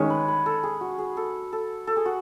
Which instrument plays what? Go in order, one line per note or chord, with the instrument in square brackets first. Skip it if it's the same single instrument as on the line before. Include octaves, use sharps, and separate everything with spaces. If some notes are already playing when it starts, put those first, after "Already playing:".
Already playing: [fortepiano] D#3 G#3 C#4
[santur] B4
B4
A4
G#4
F#4
G#4
A4
A4
A4
G#4
F#4